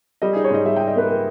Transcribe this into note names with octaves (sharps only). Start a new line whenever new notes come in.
G3 D#5
D#4 G#4
C#5
G#2 D#5
G3 E5
D#4 G5
D#5
A#3 B4
A#3